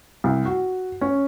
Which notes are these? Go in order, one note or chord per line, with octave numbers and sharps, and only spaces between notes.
C2
F#4
C#4